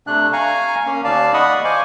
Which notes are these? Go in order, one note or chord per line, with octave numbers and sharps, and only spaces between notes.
C3 A3 D4 F#6
F5 G#5 A#5 C#6
A#3 C#4 F5
D#2 D5 F5 A5
D5 D#5 F#5 B5 C#6 D#6
C5 F5 G#5 C#6 D6